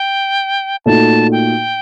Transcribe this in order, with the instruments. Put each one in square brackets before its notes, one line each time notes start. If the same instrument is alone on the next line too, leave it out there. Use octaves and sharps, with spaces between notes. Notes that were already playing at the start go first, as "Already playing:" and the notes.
Already playing: [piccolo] G5
[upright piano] A#2 A3 D#4 F#4 [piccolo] A5
[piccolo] G5